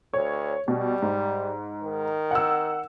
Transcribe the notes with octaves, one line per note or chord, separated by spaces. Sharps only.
D2 C#5
B2 G3
G#2
D#3
F#5 E6